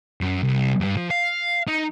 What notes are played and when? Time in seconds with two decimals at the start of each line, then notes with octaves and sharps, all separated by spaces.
0.21 F#2
0.43 C2
0.81 G2 G3
0.96 F3
1.11 F5
1.67 D#4